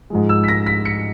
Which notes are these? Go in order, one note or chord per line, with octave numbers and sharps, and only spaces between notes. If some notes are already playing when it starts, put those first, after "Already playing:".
G#2 F3 G#3
E6
B6
A#6
B6
C#7